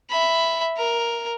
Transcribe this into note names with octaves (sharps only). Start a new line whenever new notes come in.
E5 B5
A#4